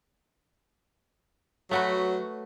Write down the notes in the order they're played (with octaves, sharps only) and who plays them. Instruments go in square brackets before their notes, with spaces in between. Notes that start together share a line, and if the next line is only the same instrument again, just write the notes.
[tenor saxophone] F#3 [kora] A3 F#4 B4